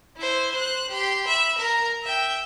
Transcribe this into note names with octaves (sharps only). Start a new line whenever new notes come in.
E4 C5
C5 F#6
G4 C6
E5 B5
A#4 A#5
E5 G5